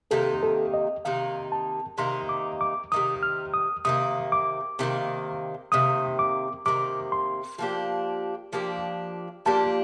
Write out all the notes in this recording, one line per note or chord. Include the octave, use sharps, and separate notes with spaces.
C3 D#3 A#3 D#4 A4
A4
D#5
C3 D#3 A#3 D#4 F5
A5
C3 D#3 A#3 D#4 C6
D6
D6
C3 D#3 A#3 D#4 D#6
F6
D#6
C3 D#3 A#3 D#6
D6
C3 D#3 A#3
C3 D#3 A#3 D#6
D6
C3 D#3 A#3 D6
C6
F3 A#3 D4 G4
F3 A#3 D4 G4
F3 A#3 D4 G4 A5